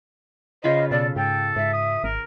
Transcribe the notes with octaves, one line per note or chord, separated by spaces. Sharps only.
C#3 F4 C5 D#5 B5
B2 A4 D5
G#2 A4 G5
G#2 E5
D#6
G#1 A#4